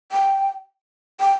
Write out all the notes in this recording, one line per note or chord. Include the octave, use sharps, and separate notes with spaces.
G5
G5